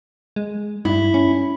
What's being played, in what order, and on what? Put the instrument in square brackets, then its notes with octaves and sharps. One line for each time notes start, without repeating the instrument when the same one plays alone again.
[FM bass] G#3
[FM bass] G2 [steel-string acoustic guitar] E4
[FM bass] C#4